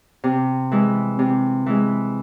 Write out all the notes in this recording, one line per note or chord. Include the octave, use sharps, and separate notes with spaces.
C3
E3 G#3
C3
E3 G#3